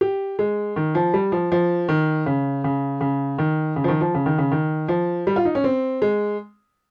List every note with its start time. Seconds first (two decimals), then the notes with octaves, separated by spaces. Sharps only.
0.01 G4
0.39 G#3
0.76 D#3
0.95 F3
1.14 G3
1.32 F3
1.52 F3
1.89 D#3
2.26 C#3
2.64 C#3
3.01 C#3
3.38 D#3
3.76 C#3
3.84 F3
3.88 D#3
4.01 F3
4.15 C#3
4.26 D#3
4.38 C#3
4.51 D#3
4.88 F3
5.27 G3
5.36 F4
5.45 D#4
5.55 C#4
5.64 C4
6.02 G#3